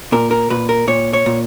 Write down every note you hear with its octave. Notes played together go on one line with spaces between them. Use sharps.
A#2 A#4
A#4
A#2 B4
A#4
A#2 C#5
C#5
A#2